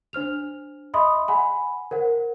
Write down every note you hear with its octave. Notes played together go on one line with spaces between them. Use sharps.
D4 C5 F6 F7
D#5 E5 B5 C6 D#6
F#5 G#5 B5
A#4 C5 F#5